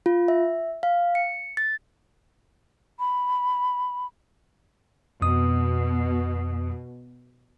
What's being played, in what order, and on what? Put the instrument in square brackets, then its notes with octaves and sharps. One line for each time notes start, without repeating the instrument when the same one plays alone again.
[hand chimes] F4
E5
F5
C#7
A6
[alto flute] B5
[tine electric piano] F2 D#6 [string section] B2